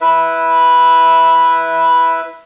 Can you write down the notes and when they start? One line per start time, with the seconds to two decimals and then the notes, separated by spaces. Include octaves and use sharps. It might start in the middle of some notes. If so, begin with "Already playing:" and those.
0.01 E4 B4 E5